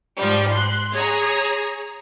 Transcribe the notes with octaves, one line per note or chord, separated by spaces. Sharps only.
G#2 F3 G3
C6 F#6
G#4 C#5 A#5